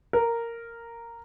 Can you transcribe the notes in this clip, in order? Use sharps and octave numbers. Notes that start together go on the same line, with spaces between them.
A#4